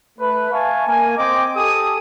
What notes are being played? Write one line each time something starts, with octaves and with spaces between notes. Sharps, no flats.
A3 B4
E5 F5 G#5 A5 C#6
A#3 G#5
C4 D#5 G5 C6 D6
G4 A4 G#5 D#6